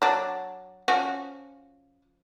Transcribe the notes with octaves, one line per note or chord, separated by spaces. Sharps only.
F#3 D4
F3 C#4 F#4